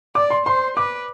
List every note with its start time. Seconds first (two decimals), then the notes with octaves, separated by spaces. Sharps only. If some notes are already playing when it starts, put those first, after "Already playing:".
0.15 D5 D6
0.30 C6
0.46 C5 C6
0.77 B4 D6